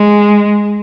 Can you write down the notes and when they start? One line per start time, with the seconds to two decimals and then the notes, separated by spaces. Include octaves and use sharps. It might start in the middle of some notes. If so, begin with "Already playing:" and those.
Already playing: G#3